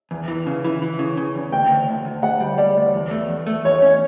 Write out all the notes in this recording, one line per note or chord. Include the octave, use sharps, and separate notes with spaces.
E2
E3
C#3
E3
E3
C#3
C#3
E2
D2 G5
D2
D2
D2
D2 F#5
G3
G3 D5
D2
E2
A3
E2
A3
E2 C#5
C#4